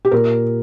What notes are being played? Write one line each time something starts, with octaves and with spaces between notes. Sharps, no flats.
G4
A#2 A#4